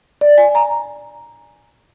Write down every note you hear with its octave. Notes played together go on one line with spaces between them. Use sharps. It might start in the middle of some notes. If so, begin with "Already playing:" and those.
D5
G#5
A#5